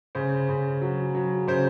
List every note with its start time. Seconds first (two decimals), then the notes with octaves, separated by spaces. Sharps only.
0.15 C#3 C5
0.49 C#3
0.82 F#3
1.15 F#3
1.48 C#3 C5